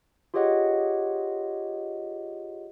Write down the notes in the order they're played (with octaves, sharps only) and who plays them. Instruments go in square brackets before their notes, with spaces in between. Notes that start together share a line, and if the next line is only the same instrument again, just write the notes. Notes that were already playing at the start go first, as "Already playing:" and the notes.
[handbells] F4 G4 G#4 C#5 D#5 F#5